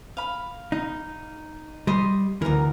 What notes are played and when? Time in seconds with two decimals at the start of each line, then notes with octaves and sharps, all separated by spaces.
0.17 F5 B5
0.72 D#4
1.87 G3 D#5 C6
2.42 D2 E3 A#4 A#5